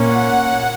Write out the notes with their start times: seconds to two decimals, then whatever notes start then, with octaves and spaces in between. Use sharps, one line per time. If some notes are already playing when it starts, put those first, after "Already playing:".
Already playing: A#2 A#3 C#4
0.09 F#5